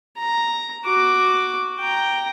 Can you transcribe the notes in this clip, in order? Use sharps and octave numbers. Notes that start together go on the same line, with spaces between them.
A#5
F#4 D6
G5 A#5